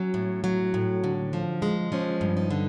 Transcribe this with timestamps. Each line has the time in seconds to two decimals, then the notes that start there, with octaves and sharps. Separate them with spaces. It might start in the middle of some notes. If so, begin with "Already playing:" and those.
Already playing: F#3 C#4
0.14 A2
0.44 F#3
0.74 A2
1.04 D3
1.33 F3
1.62 G#3
1.92 F3 C#4
2.21 G2
2.37 D#4
2.51 D3